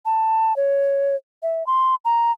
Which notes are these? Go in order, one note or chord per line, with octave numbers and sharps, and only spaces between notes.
A5
C#5
E5
C6
A#5